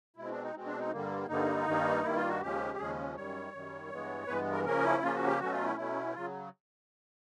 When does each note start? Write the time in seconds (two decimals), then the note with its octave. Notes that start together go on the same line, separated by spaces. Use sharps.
0.16 B2 G#3 C4 E4
0.29 D4
0.42 D#4
0.54 B2 G#3 C4
0.66 D4
0.79 D#4
0.92 G2 D3 G3 A#3
1.28 G2 D3 G3 A#3 D#4
1.66 G2 D#3 G3 A#3
2.03 G2 D#3 G3 A#3 E4
2.16 F4
2.28 F#4
2.41 D#2 C#3 F3 G#3 C#4 G4
2.78 D#2 C#3 F3 G#3 C#4 G#4
3.16 F#2 D#3 G3 C#5
3.52 F#2 D#3 G3
3.90 G2 E3 G#3 B3
4.27 G2 E3 G#3 B3 B4
4.52 A#4
4.64 C#3 F3 A#3 C#4 A#4
4.84 E4
5.02 C#3 F3 A#3 C#4 F4
5.14 F#4
5.27 G4
5.39 B2 F#3 A3 C#4 F#4
5.52 F4
5.65 E4
5.76 B2 F#3 A3 C#4 E4
6.13 C#3 F#3 F4